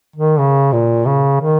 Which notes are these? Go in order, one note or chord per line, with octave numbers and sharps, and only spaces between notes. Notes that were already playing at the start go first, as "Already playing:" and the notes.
D#3
C#3
A#2
C#3
D#3